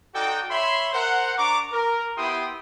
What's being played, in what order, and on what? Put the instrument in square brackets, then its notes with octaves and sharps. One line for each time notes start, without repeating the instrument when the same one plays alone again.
[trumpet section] D#4 F#4 A4 D5 G5
C#5 E5 B5 C6
A#4 C5 F#5
D4 A#5 C#6 D6
A#4
B3 E4 G4 G5 C6 D#6